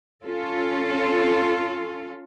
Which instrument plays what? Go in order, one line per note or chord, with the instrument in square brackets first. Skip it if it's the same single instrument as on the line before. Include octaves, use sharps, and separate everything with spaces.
[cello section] C#4 F4 A4